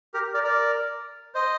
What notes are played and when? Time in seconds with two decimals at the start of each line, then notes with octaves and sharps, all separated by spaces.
0.14 G4 A#4
0.34 A#4 D5
0.44 A#4 D5
1.34 C5 D#5